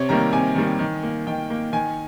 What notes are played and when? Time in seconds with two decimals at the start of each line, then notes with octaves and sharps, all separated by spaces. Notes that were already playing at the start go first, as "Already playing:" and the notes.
Already playing: C3 C#5
0.09 D#3 G3 A#3 A#5
0.33 C3 G#5
0.56 D#3 G3 A#3
0.79 D#3
1.03 A#3
1.27 D#3 G5
1.50 A#3
1.73 D#3 G#5